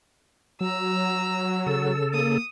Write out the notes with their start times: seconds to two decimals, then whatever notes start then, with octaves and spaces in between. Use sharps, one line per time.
0.61 F#3 A#5 E6
1.66 C#3 A4 E6
2.14 A#3 D#6